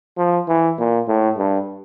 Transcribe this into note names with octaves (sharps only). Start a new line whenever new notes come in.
F3
E3
A#2
A2
G2